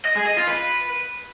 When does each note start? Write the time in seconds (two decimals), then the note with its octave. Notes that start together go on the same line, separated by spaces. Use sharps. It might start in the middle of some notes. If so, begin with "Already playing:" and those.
0.05 D#5
0.16 G#4
0.26 D#5
0.37 F4
0.48 B4